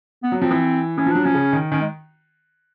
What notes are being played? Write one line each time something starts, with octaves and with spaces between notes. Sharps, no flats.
B3
F#3
F3 C4
E3
E3 C#4
F3
F#3 D4
F3 C#4
C#3
D#3
D#3 C#4
G#3